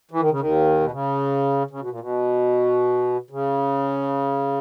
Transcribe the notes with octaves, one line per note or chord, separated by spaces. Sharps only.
E3
D#3
C#3
D#2 D#3
B2
C#3
C#3
B2
A#2
B2
C#3